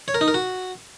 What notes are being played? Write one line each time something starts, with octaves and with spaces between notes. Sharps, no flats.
C#5
A#4
D#4
A#4
F#4